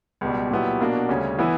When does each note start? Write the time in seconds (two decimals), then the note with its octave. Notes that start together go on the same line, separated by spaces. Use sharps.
0.21 C#2 B2 G3
0.51 A#2 F#3 B3 E4 G4
0.80 B2 A#3 D4 F#4
1.09 D2 C#3 G3 C#4
1.39 E3 B3 E4